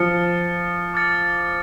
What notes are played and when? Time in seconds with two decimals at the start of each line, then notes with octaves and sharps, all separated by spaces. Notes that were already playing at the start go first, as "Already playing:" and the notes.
Already playing: F3 F6 A6 C#7
0.94 D6 F6 A6 C#7